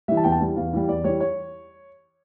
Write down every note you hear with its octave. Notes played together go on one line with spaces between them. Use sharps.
E3 G3 E5
A5
E2 G5
A5
E3 G3
E2 F5
E3 G3
E2 D5
E3 G3 C#5
C#5